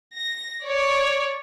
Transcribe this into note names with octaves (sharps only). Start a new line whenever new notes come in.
A#6
C#5 D5